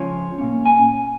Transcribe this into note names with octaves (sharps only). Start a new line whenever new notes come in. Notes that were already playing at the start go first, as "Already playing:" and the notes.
Already playing: C#2 C#3 F3 C#5
A#2 A#3 C#4
G#5